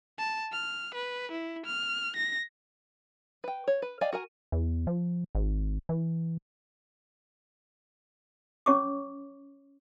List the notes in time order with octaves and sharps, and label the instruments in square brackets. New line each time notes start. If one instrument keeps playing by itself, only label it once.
[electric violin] A5
F6
B4
E4
F6
A#6
[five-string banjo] B4 G5
C#5
B4
D5 D#5 F5 G5 G#5
F#4 A#4 G#5
[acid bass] E2
F3
G#1
E3
[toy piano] C#4 C#5 C#6 D6